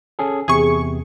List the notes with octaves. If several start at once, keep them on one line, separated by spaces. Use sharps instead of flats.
C#4 G#4 A4
E2 C3 G#4 C#6